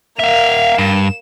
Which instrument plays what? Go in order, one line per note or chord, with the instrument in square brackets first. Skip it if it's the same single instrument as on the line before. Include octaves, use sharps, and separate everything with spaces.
[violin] A#3 F7 [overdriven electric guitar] E5 F5
[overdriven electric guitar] G2 [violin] E7